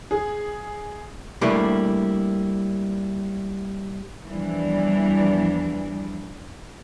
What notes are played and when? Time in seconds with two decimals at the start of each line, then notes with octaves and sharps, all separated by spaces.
0.11 G#4
1.41 G3 A3 A#3 D4 E4 G4
4.26 E2 E3 F3 G3 B3 D4